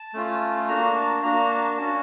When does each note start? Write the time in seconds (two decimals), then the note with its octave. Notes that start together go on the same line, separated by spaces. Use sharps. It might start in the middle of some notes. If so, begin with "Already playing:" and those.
Already playing: A5
0.14 A3 C#4 F4
0.68 A#3 D4 F#4 A#5
0.96 A5
1.23 A#3 D4 F#4 A#5
1.50 A5
1.78 C#4 F#4 A5